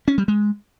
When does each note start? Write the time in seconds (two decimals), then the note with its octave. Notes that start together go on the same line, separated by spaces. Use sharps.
0.08 C#4
0.18 G3
0.28 G#3